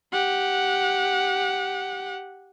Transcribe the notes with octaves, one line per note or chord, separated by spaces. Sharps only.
G4 F#5